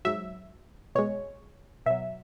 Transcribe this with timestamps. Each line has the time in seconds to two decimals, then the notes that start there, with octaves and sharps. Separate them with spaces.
0.05 G#2 F#3 E5
0.95 B2 G#3 C#5
1.86 B2 F#3 E5